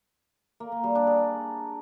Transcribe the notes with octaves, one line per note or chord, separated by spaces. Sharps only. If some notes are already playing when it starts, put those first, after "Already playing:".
A#3
A#3
G3
D4
G#4